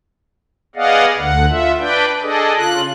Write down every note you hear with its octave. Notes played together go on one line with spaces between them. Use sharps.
B3 G#4 D5 D#5 F5 F#5
D2 D3 F#5
F4 E5
D4 B4 D5 G5
D4 G#4 A4 D5 D#5
C#3 F4 F#6